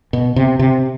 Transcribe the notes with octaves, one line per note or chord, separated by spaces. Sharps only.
B2
C3
C3